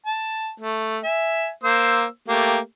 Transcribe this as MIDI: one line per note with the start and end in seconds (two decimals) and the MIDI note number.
0.06 0.53 81
0.60 0.98 57
1.04 1.50 76
1.04 1.50 80
1.64 2.05 58
1.64 2.05 72
1.64 2.05 88
2.28 2.58 57
2.28 2.58 58
2.28 2.58 67